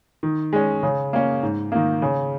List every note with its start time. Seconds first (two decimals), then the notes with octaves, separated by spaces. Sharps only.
0.23 D#3
0.53 G#3 C#4
0.83 C#3
1.13 A#3 C#4
1.43 G#2
1.72 D#3 A#3
2.02 C#3